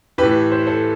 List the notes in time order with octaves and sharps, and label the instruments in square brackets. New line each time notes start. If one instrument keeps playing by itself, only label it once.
[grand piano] A2 E3 G4 B4
C5
A4 C5